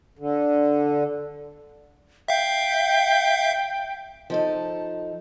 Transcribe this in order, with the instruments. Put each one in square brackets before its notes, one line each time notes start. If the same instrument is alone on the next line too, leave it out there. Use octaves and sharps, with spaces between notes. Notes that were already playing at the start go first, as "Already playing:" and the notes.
[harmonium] D3
[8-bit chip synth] E5 F5 [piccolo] G5
[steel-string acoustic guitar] F3 D#4 A4